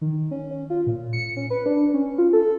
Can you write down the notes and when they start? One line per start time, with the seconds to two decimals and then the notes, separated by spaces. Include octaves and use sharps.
0.01 D#3
0.31 C#4
0.51 C#4
0.70 F4
0.86 A#2
1.13 C#7
1.37 C#4
1.50 B4
1.66 D4
1.94 C#4
2.18 F4
2.33 A4